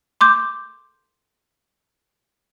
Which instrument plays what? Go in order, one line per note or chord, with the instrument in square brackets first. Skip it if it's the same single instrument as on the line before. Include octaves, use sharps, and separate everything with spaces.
[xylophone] C6 D6 G6